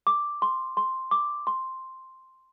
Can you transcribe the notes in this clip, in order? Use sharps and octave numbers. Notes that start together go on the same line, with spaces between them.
D6
C6
C6
D6
C6